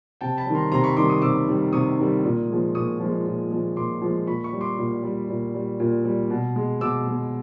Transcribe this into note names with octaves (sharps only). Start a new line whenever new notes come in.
C3 G5 A5
A5 B5
D#3 G3
A#5 C6
C3 A#5 C6
B5 C#6
D#3 G3 C6 D6
C#6 D#6
C3 D6 E6
D#3 G3
C3 C#6 D#6
D#3 G3
A#2
F3 G#3
A#2 C#6 D#6
F3
G#3
A#2
F3 G#3
A#2 C6 D6
F3 G#3
A#2 B5 C#6
B5 C#6
G3
C6 D6
A#2
G3
A#2
G3
A#2
G3
B2
G#3
B2 D6 E6
G#3